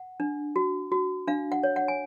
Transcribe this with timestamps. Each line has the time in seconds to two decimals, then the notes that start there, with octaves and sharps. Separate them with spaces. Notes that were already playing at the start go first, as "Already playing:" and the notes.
Already playing: F#5
0.20 D4
0.56 F#4
0.92 F#4
1.27 D4 F5
1.52 F#5
1.63 C#5
1.76 F#5
1.88 G#5